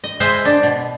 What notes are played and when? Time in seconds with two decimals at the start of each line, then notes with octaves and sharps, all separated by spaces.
0.04 D#5
0.20 G#3 B4 C5 D#5 E5
0.45 D4
0.63 B2